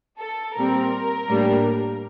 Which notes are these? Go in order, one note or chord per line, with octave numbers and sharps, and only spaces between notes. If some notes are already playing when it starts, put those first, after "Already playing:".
A4
A#2 G3 C4 A#4
A2 G3 A#3 D4